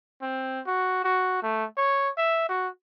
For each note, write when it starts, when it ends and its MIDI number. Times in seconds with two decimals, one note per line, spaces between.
0.22 0.60 60
0.67 1.03 66
1.04 1.40 66
1.43 1.65 57
1.77 2.10 73
2.18 2.45 76
2.49 2.68 66